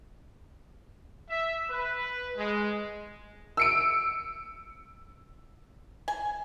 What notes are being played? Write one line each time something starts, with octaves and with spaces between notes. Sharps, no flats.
E5
B4
G#3
E6 C#7 D7
G#5